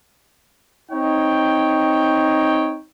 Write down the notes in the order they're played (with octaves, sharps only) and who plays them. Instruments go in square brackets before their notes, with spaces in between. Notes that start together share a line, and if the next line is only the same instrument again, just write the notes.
[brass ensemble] C4 D#4 C#5 G5